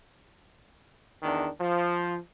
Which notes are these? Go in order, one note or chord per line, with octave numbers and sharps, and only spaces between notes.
E2 D#3 D4
F3